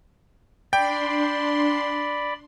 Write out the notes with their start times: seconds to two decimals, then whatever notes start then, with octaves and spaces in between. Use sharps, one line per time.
0.73 D4 D5 G5 B5 C6